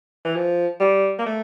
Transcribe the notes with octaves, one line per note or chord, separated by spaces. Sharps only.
E3
F3
G3
A#3
A3